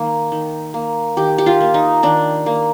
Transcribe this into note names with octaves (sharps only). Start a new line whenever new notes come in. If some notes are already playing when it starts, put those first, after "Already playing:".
Already playing: D#3 A#3
D#3
A#3
D#3 G4
G4
F4
A#3
D#4
D#3 D4
A#3